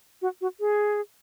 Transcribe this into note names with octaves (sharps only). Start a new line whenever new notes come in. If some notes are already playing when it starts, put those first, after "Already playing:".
F#4
F#4
G#4